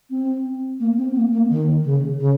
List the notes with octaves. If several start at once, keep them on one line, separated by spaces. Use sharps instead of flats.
C4
A#3
C4
A#3
A#3
D#3
C#3
C#3